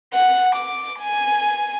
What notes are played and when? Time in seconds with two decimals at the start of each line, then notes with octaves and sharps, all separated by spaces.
0.13 F#5
0.55 D6
1.00 G#5